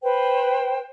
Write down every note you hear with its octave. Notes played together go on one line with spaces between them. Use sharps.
B4 C5 G5